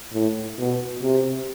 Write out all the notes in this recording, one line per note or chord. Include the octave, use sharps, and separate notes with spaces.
A2
B2
C3